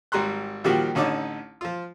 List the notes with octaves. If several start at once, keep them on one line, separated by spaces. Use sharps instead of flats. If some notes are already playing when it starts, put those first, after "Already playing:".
G#1 G3 A#5 C6 F#6
A#2 D#3 F3 G3 F#4 G4
A1 D3 C#4 D#4 A5 D6
F3 F4